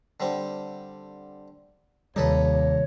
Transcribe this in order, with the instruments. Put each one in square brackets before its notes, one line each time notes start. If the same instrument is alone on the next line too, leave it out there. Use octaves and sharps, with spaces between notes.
[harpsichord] D3 G3 C4
[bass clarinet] D#2 [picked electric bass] C3 D#3 G3 [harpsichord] D#4 A4 B4 [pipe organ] C#5